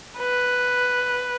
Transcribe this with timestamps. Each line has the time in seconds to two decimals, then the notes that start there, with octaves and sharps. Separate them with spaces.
0.18 B4